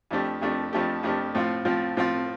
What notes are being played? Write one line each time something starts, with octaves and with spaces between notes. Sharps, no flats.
F2 F3 A3 D4 G4
F2 F3 A3 D4 G4
F2 F3 A3 D4 G4
F2 F3 A3 D4 G4
A2 F3 C4 F4
A2 F3 C4 F4
A2 F3 C4 F4